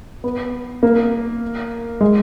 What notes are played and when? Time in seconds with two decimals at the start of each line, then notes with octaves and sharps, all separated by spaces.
0.24 B3
0.83 A#3
2.01 G#3